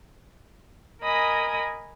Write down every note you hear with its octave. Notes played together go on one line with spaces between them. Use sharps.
A#4 D#5 G#5 B5 D#6